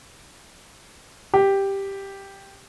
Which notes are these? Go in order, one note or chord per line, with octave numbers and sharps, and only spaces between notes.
G4